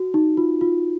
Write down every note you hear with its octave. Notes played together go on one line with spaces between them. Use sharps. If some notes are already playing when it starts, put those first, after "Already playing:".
Already playing: F#4
D#4
F4
F4